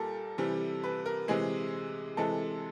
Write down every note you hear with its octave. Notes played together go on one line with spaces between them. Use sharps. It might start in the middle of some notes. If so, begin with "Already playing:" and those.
Already playing: A#2 G3 A4 A#4
C3 E3 G3
B4
A#4
C3 E3 G#3 G#4
C3 E3 G#3 A4